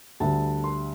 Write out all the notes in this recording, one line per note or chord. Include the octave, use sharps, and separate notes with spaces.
D2 D3 G3 A5
C6